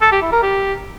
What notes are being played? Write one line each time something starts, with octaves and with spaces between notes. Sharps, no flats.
A4
G4
E4
A#4
G4